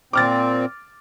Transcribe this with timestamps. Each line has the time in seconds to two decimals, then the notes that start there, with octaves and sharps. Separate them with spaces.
0.13 A#2 C4 D6 F6 A6